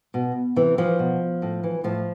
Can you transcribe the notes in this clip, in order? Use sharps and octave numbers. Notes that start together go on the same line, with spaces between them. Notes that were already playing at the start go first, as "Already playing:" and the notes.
B2
C3 E3
E3 F3
B2
A2
E3
A2 F3